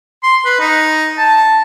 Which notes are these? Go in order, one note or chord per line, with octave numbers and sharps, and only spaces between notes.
C6
B4
D#4
A5